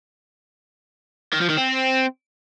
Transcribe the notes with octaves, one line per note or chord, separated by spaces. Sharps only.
D#3
F3
D#3
C4